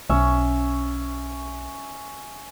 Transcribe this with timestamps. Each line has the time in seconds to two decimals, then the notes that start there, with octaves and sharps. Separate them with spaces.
0.10 B1 C#4 E5